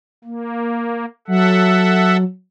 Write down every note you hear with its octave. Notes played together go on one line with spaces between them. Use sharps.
A#3
F#3 A4 E5 F#5